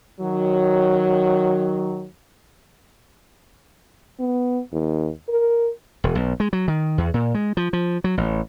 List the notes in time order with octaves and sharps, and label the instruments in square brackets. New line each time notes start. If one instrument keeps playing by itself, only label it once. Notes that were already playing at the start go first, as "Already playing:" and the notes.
[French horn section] D#3 F#3
[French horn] B3
D#2
A#4
[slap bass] E1
B1
G#3
F#3
D#3
E2
A#2
G#3
F3
F3
F#3
A1